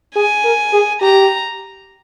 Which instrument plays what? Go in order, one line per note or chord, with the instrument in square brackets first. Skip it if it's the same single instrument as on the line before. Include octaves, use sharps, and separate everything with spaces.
[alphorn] G#4 [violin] G#5
[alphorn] A#4
G#4
[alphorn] G4 [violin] A#5